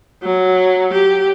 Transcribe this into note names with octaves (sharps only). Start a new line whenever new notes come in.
F#3
G4